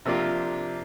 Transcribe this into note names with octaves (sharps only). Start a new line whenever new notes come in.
C3 F3 A#3 D4 F4 G4